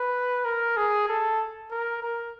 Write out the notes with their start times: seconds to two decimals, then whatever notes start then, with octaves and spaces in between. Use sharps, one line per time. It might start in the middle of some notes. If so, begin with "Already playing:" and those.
Already playing: B4
0.45 A#4
0.77 G#4
1.08 A4
1.71 A#4
2.02 A#4